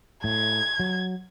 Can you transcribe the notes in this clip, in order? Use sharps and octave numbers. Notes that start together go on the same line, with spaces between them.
A2 G#6
F#3